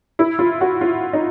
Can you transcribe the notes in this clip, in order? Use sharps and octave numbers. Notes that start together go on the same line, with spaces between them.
E4
F4
F#4
F4
D#4